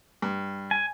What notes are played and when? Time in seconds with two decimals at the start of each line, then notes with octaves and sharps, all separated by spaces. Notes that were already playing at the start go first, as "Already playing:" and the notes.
0.22 G2
0.71 G#5